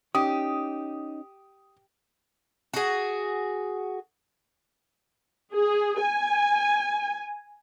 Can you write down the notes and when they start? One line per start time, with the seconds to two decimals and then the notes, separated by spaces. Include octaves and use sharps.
0.15 C#4 D#4 G4 D#6
2.74 F#4 G#4
5.55 G#4
6.00 G#5